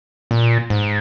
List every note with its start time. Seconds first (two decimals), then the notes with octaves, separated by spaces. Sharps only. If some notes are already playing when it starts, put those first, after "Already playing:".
0.31 A#2
0.70 G#2